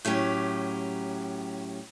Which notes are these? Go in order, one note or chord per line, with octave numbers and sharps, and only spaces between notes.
A2 F#3 C#4 G4